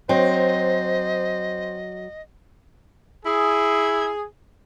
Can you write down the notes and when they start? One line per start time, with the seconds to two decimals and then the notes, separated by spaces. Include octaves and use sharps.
0.09 F#3 C4 C5 D#5
3.26 E4 G#4